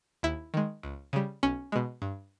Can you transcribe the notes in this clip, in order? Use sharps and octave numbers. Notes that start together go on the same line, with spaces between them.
D#2 E4
D#3 G#3
C#2
C#3 G3
B1 C#4
B2 G#3
G2